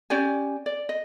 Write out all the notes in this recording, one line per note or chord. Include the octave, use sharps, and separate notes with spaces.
C#4 G4 D5 G#5
D5
D#5